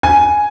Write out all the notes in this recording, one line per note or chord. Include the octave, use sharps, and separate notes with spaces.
G#5